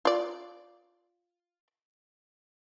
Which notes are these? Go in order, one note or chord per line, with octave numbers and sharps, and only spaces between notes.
F4 D5